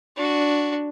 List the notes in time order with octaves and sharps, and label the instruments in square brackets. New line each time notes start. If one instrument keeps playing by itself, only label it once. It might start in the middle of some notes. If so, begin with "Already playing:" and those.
[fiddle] D4 F#4